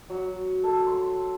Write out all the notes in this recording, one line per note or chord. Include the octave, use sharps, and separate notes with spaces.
F#3
A4
C6